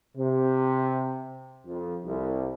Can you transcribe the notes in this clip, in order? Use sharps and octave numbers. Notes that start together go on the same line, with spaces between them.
C3
F2
C2